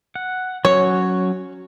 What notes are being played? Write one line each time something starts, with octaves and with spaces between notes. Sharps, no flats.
F#5
F#3 C#4 F#4 C#5